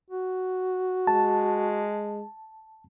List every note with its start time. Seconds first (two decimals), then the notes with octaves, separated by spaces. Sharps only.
0.10 F#4
1.07 G#3 A5